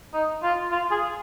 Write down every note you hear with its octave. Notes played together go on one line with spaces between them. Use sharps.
D#4
F4
F4
G#4